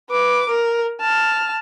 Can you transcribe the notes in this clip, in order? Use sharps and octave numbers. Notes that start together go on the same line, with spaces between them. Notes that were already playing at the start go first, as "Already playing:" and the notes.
B4 D6
A#4
A5 F6